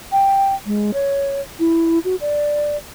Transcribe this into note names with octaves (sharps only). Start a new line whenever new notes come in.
G5
G#3
C#5
E4
F#4
D5